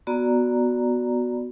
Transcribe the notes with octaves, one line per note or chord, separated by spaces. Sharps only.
B3 F#4 D5 A#5